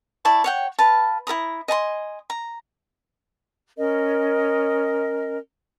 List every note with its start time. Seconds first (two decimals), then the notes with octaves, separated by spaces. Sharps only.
0.25 E4 D5 A5 C#6
0.44 C#5 F#5 G5
0.79 B4 F5 A5
1.27 E4 A#4 A#5 D#6
1.68 D#5 G#5 A5 C6
2.30 A#5
3.77 C#4 A#4 D#5